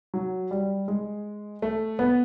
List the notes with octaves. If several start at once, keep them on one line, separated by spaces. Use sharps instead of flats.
F#3
G3
G#3
A3
B3